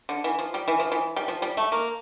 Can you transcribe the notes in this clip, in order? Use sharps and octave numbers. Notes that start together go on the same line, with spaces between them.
D3
E3
F3
G3
E3
F3
E3
G3
F3
G3
A3
A#3